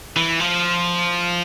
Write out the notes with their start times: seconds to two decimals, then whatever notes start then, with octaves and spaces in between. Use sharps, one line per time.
0.16 E3
0.40 F3